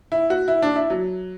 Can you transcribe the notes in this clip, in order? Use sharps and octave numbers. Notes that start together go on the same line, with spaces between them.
E4
F#4
E4
D4
E4
F#3